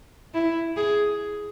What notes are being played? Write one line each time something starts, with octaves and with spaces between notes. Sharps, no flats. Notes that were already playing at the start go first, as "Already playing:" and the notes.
E4
G#4